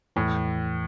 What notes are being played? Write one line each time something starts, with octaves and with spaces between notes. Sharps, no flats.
E2 A2 E3